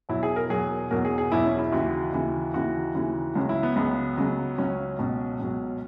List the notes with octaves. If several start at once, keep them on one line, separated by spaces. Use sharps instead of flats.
E2 B2 F#3 E4
G#4
A#4
E2 B2 F#3 G#4
E2 B2 F#3 A#4
G#4
G#4
E2 B2 F#3 E4
C#4
E4
D#2 C#3 E3 F#4
D#2 C#3 E3
D#2 C#3 E3 F#4
D#2 C#3 E3
C#2 C#3 F#3
E4
B3
C#2 C#3 F#3 B3
C#2 C#3 F#3
C#2 C#3 F#3 C#4
C#2 B2 F#3
C#2 B2 F#3